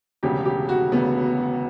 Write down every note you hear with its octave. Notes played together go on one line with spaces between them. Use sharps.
E1 D2 C#3 G4
G4
F#4
E1 D2 C#3 B3